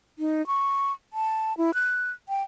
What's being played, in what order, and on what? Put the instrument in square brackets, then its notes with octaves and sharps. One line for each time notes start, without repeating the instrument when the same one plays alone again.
[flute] D#4
C#6
A5
E4
F#6
G5